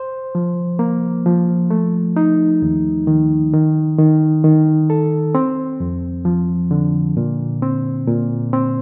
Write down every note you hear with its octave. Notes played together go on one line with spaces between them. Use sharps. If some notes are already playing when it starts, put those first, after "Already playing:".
Already playing: C5
F3
A#3
F3
A3
D#4
D#2
D#3
D#3
D#3
D#3
A4
C4
F2
F3
D3
A#2
C4
A#2
C4